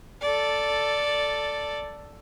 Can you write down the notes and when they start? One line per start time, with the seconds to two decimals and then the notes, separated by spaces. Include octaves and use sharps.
0.21 A4 D5